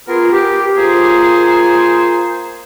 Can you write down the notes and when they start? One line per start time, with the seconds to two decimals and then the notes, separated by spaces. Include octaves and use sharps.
0.08 B3 F4 G#4 A#4
0.33 G4
0.77 A#3 F4 G#4 C5 A#5